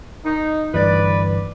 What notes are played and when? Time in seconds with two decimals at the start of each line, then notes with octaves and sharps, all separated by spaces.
0.25 D#4
0.74 D2 G2 E3 B4 D5